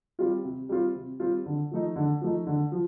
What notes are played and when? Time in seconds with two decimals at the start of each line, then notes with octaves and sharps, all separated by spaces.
0.19 G3 C4 F4
0.45 C3
0.69 G3 C4 F4
0.95 C3
1.20 G3 C4 F4
1.46 D3
1.71 F3 A3 D#4
1.96 D3
2.21 F3 A3 D#4
2.47 D3
2.72 F3